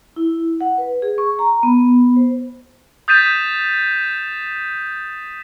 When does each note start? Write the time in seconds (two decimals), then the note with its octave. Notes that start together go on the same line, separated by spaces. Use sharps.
0.16 E4
0.61 F#5
0.78 B4
1.02 G#4
1.18 C#6
1.39 A#5
1.63 B3
2.16 C5
3.08 D#6 G6 A6 B6 D#7 E7